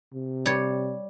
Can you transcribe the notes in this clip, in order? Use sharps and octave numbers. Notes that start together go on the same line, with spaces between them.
C3
G3 C#5